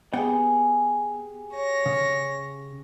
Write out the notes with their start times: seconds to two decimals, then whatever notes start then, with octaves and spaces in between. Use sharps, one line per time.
0.13 B3 G4 G#4 F#5 G5
1.52 C#5 A#6
1.86 C#3